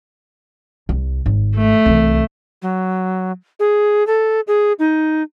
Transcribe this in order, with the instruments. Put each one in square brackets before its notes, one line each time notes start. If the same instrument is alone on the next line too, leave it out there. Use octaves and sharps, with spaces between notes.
[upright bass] C2
G#1
[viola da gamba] A3
[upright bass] C2 E3
[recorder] F#3
G#4
A4
G#4
D#4